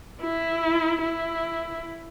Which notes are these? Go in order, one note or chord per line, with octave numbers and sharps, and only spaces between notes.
E4
E4